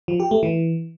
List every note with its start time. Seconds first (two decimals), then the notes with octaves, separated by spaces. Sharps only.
0.08 F3
0.20 G4
0.31 A3
0.43 E3